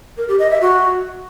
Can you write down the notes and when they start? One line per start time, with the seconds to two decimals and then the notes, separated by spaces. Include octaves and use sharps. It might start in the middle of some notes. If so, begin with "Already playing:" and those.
0.17 A#4
0.28 G4
0.39 D#5
0.50 E5
0.61 F#4